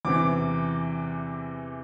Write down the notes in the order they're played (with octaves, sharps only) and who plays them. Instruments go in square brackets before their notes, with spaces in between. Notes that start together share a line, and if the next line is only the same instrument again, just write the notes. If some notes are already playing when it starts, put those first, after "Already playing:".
[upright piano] E2 C3 E3 D6